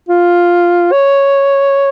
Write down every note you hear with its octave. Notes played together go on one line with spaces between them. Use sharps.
F4
C#5